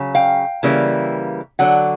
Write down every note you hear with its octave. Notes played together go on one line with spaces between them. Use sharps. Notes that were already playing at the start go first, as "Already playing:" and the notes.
Already playing: C#3 F#3
F5 G5
C#3 E3 G3 A#3
D3 F#3 F#5